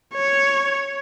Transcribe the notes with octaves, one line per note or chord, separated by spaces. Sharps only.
C#5